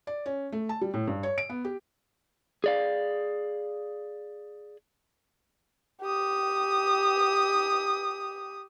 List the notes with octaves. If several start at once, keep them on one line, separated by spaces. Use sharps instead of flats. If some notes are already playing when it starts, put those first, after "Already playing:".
D5
C#4
A3
A5
G3
A2
G2
C#5
D7
B3
G4
G#4 D5 F5
G4 D#6